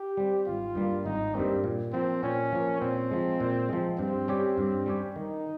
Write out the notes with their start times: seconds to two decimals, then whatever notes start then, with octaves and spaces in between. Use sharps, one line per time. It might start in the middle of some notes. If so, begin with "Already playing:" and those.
Already playing: G4
0.17 G3 C4
0.47 G#1 F4
0.75 G2 G3 A#3
1.05 G#1 D#4
1.35 G2 G3 A#3 C4
1.64 A#2
1.93 F3 A#3 C4
2.23 A#2 C#4
2.52 F3 A#3
2.81 A#2 C4
3.11 F3 G#3
3.40 A#2
3.69 F3 G#3
3.99 G2 C4
4.28 G3 C#4 G4 C#5
4.58 G2
4.86 G3 C#4 G4 C#5
5.16 D#3 D#4